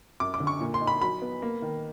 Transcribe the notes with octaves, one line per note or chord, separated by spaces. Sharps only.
F#2 D6
D6
D3
C#6
A#2
C6
D#4
B5
F#3 B5
B3
A#3
D#3